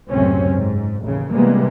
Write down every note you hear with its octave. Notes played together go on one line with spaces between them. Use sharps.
C#2 F#2 A2 C3 C4 C#4
G#2
A1 D#2 C#3
C3 E3 G3 G#3 A#3 B3